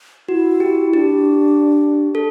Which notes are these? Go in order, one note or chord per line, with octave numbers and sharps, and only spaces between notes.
E4 F#4
G4
D4 G4
A4